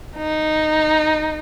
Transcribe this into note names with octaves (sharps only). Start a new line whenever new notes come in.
D#4